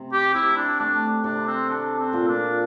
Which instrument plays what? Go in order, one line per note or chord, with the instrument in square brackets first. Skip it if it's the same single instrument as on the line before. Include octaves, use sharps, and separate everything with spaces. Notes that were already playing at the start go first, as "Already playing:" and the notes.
Already playing: [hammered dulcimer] C3
[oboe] G4
[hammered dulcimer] C3 [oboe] E4
[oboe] D4
[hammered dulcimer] A3 [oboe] D4
[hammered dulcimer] C3 [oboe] D4
[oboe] C4
[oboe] D4 [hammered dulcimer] A4
[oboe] C4
[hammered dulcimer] A#2
[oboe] D4